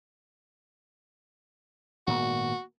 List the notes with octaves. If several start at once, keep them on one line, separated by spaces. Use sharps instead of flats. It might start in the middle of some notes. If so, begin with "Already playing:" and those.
G#1 A#2 B3 F#4